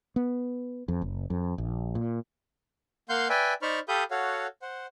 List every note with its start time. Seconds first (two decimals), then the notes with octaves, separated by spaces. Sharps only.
0.16 B3
0.88 F2
1.02 F#1
1.30 F2
1.58 A#1
1.95 A#2
3.09 A#3 F5 F#5 C6 G6
3.29 B4 D5 E5 G5 G#5
3.62 D#4 C5 D5 B5 C#6 F6
3.88 G4 A4 F5 B5 D#6 G6
4.11 F#4 A4 C#5 F5 F#5
4.62 C5 F#5